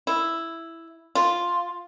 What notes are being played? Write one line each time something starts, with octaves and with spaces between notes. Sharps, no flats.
E4
F4